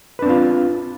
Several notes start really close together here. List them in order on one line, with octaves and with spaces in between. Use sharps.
B4 D4 C4 F4